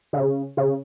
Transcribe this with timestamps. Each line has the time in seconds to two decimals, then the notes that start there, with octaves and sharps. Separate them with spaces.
0.13 D3
0.17 C#3
0.57 C#3